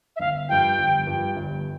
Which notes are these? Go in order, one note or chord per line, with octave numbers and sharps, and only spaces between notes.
E5
G1 F5
G2 F3 G5
G1
G2 F3
G1